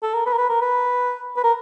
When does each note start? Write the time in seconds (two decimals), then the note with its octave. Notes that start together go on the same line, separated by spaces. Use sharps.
0.02 A4
0.14 A#4
0.26 B4
0.33 A#4
0.37 B4
0.49 A#4
0.61 B4
1.37 B4
1.44 A#4